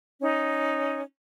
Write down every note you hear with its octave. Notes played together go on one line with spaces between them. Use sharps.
C#4 D#4